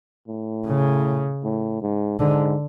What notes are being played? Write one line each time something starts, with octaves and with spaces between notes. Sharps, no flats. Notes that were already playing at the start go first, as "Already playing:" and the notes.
A2
C#3
A2
G#2
G#2 D3